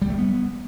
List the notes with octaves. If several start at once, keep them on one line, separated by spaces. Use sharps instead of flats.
G3
A3
B3